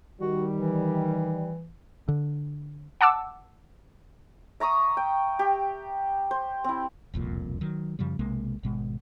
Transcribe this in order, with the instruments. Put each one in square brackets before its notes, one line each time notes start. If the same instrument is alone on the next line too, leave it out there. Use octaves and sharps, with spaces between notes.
[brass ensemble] D#3 G3 [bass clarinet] F#4
[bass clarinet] E3
[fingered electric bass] D3
[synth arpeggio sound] F#5 A5 D6 E6
[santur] E5 A#5 C#6 D#6
G5
G4
C5
C4 E4
[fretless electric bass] E1 C2 F2 A#2
D#3 F#3
F#2 C#3 F3 G3
B1 C3 G#3 A#3
G#1 B2 G#3